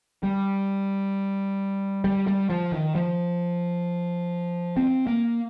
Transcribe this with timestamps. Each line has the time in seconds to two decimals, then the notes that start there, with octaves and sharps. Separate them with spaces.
0.23 G3
2.04 G3
2.27 G3
2.50 F3
2.72 D#3
2.95 F3
4.77 C4
5.07 A#3